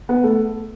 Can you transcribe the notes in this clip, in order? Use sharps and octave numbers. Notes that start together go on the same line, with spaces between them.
B3
A3